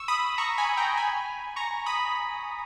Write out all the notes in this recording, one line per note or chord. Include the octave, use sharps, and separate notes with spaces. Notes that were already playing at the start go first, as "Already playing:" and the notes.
Already playing: C#6 E6
B5 D#6
A#5 C#6
G#5 B5
G5 A#5
G#5 B5
A#5 C#6
B5 D#6